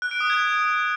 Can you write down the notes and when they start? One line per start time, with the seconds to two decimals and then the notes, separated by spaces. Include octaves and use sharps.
0.02 F#6
0.11 D7
0.20 D#6
0.30 G#6